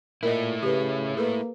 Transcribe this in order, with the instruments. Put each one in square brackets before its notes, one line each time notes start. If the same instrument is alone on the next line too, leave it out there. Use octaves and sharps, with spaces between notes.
[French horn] A#2 [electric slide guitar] A3 E4 [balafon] A#4 D#5
[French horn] C#3 [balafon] G4 B4
[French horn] A#3 [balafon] G#4 A4 B4